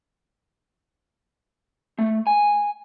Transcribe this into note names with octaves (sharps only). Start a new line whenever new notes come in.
A3
G#5